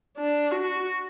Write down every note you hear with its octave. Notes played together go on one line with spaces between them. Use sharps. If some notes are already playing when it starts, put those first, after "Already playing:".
D4
F#4